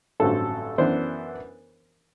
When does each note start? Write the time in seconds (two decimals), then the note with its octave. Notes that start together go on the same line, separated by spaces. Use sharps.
0.20 A1 G2 D3 F#3 C4 A4
0.78 F#2 E3 B3 D4 C5